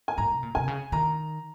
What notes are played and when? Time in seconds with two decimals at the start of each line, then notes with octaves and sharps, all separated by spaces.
0.08 G#5
0.18 G#2 A#5
0.32 C3
0.43 A#2
0.55 C3 G#5
0.68 C#3
0.92 D#3 A#5